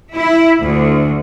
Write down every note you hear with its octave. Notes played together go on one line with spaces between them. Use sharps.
E4
D2